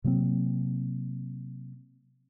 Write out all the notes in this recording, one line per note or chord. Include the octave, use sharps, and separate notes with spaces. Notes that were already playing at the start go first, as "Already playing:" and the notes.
C3 F#3 A#3 C4